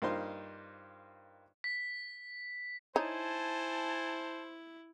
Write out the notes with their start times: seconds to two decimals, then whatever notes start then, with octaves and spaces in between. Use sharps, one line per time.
0.02 G2 A#3 D#4 F4 C5 C6
1.64 B6
2.96 D#4 E4 C5 C#5 G#5 A5